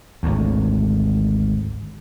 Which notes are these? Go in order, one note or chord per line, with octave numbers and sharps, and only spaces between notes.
G#1 D2